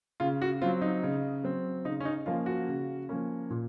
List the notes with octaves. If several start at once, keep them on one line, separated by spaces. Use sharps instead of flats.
C#3 F4
F#4
F#3 C4 F4
D#4
C#3
F#3 C4
C#3 D#4
C#4
D#4
F3 A#3 C#4 F4
F#4
C#3
F3 A#3 C#4
A#2